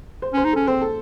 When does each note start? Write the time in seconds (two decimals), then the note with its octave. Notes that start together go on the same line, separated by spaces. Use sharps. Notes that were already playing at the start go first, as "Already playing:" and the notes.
0.22 C5
0.33 C#4
0.37 C5
0.45 D#4
0.53 C#4 A4
0.67 C4 C5
0.82 A4